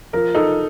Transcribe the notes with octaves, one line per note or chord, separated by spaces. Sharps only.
F3 A#4
D#4 A4